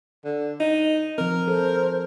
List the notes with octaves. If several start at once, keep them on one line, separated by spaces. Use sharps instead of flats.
D3
D#4
F3 C4 A#4
A4 C5